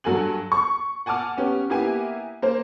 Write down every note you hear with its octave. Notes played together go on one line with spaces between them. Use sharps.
G2 F#3 A4 G#5 F#7
C#6
F#5 G#5 A5 D6 F6
B3 C#4 G4
A#3 B3 E4 G4 E5 G#5
A#3 C5